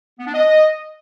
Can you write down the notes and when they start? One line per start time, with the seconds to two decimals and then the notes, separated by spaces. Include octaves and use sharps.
0.18 B3
0.26 D4
0.34 D#5